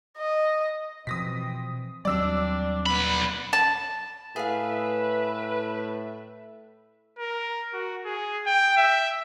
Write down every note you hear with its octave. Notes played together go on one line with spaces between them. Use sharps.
D#5
B2 E3 F3 C4 D#6 A#6 B6
D#2 F#3 G3 C4 D4 D5 E6
B1 A#2 B3 B5 F#6
A5
A2 G#4 B4 E5 F5
A#4
F#4
G#4
G5
E5